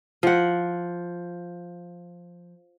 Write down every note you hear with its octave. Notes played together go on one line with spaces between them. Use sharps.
F3 F#5